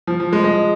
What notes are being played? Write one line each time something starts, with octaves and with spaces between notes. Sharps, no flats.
F3
F3
G#3
G#3